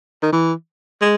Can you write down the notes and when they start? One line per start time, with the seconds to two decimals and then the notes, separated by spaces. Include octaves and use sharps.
0.23 D#3
0.33 E3
1.02 G#3